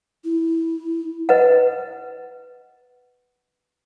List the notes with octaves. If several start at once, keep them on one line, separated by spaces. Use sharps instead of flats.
E4
B4 D#5 F#5